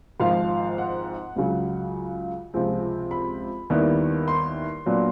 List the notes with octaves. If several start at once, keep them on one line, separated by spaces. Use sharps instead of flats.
G#1 G#2 F3 F5
F#5
C#2 C#3 F#3
C#2 C3 F3 G#3 C4
B5
D#2 D#3 G3 B3 E4
C6
A#2 F#3 B3 D4